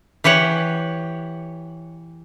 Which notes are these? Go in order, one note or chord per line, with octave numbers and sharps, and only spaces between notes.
E3 G4 C#5 F#5